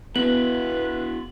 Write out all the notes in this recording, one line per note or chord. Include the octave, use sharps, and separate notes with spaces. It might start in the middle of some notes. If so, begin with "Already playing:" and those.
B3 E4 F#4 B4 F#7